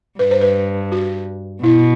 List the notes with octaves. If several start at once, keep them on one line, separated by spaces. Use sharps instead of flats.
G2 B4
C5
B4
F#4
B2 E4